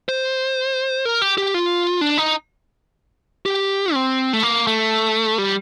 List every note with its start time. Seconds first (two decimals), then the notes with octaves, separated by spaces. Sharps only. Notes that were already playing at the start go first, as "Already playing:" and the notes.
0.09 C5
1.05 A#4
1.22 G4
1.38 G4
1.54 F4
2.01 D4
2.18 D#4
3.46 G4
3.94 C4
4.33 A3
4.43 A#3
4.67 A3
5.38 G3